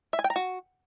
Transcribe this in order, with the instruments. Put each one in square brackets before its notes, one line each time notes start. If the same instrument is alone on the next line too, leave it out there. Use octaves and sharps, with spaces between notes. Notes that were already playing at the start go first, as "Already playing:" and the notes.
[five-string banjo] E5
G#5
G5
A#5
F#4